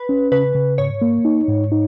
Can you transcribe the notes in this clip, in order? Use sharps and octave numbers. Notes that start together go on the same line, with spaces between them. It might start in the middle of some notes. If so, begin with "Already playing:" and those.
Already playing: B4
C#4
C#3 B4
C#3
G#2 C#5
A#3
D#4
G#2
D#4